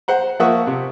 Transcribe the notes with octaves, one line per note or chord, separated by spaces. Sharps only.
C5 F#5 A#5
F3 A#3 E5 F#5 C#6 D#6
C3